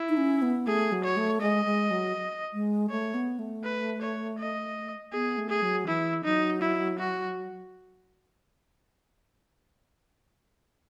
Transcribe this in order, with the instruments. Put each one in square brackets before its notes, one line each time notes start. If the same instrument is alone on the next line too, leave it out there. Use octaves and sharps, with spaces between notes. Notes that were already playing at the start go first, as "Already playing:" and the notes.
Already playing: [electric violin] E4
[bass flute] D#4
C#4
B3
[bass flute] A3 [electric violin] G#4
[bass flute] F#3
[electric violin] C#5
[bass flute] A3
[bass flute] G#3 [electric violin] D#5
[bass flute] G#3
F#3
G#3
[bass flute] A3 [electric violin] C#5
[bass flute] B3
A3
[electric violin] B4
C#5
D#5
[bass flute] B3 [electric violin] G#4
[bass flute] A3
[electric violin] G#4
[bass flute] F#3
[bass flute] E3 [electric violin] E4
[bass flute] F#3 [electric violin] D#4
[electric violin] E4
F#4